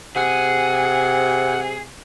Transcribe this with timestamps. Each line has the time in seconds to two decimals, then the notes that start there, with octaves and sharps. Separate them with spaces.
0.16 C3 G#4 F#5